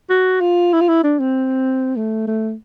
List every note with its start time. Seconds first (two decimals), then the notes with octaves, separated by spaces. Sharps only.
0.10 F#4
0.41 F4
0.73 E4
0.81 F4
0.89 E4
1.04 D4
1.19 C4
1.97 A3
2.28 A3